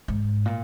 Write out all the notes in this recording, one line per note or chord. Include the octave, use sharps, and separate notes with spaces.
G#2
A#2